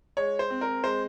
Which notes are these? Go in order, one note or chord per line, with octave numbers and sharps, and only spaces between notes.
G#3 C#5
C5
C4
A#4
G#3 C5